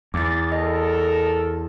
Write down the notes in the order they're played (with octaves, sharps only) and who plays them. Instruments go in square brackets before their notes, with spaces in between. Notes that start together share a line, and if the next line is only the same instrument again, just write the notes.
[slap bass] E2 [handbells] D6 A6
[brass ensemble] A4 A#4 [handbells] D#5